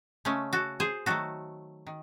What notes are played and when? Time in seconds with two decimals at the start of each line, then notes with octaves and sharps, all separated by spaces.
0.25 C#3 G#3 A3 C#4
0.53 F#4 A4
0.80 G#4 C5
1.06 D#3 F#3 A3 F#4 A4
1.87 D#3